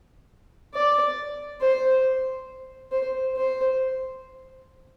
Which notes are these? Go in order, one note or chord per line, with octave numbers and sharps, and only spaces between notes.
D5
C5
C5
C5